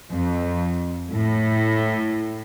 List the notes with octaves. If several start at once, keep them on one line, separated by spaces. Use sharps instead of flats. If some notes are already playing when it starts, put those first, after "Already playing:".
F2
A2